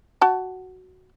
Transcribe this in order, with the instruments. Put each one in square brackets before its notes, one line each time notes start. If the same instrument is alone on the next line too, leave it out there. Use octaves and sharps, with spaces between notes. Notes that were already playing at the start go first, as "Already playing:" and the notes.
[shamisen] F#4 A5